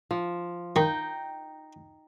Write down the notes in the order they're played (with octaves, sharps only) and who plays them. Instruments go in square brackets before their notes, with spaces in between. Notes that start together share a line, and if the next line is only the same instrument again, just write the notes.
[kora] F3
[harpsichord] D#3 [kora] D#4 G5